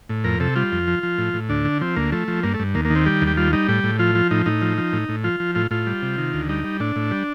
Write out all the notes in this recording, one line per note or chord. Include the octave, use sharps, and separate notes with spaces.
A2
F2 A#4
C3 A4
G3 F4
F2
F3
F3
A2
A2
D2 D4
D3
F3 C4
D2 A#3
F3 A3
F3
G2 A#3
A3
G2
D#2 A#3
A#3
D#3
C4
G3 G4
D#2
G4
G3 F4
G3 D#4
A2 G4
A2
F3 F4
F3
A2 D#4
A2 D#4
F3
F3
A2
A2
F3 F4
F3
A2 F4
A2 F4
G3
C3
D#3
D2
G3 D#4
G3
A2 D4
A2
G3